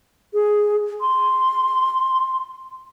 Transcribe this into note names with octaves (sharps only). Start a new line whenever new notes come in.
G#4
C6